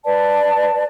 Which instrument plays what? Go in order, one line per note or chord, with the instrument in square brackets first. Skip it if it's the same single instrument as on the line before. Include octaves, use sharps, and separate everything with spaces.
[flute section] B4 D5 A5